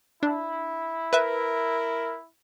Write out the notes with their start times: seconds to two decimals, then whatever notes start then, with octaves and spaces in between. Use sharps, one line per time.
0.23 D4 E4
1.13 A#4 B4 E5